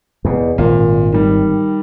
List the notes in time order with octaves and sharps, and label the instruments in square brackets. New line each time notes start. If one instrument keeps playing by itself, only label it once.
[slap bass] E2 B2
[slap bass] G#1 [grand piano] A#2
[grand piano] D#3 G3